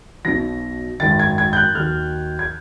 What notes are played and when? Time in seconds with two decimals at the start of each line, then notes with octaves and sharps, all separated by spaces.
0.25 B1 B2 F#3 A#6
1.00 G#1 F#2 D#3 A6
1.19 G#6
1.38 G#6
1.53 G6
1.56 F#6
1.75 D#2 D#3 F#3 F6
2.39 G#6